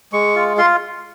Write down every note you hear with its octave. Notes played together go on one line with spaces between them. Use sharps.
G#3 C#6
F4
F4 C6